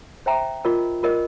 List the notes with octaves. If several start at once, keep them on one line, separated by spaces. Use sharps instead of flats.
C5 E5 G5 A#5
F4 A#4 D#5
F4 A#4 D#5